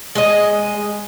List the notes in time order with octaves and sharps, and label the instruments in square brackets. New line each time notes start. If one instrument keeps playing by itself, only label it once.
[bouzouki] G#3 D#5